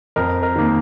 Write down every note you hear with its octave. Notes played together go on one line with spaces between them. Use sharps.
F2 A#4
A#4
D#3 A#3